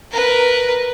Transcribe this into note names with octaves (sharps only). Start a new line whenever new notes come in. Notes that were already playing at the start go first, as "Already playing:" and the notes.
A#4 B4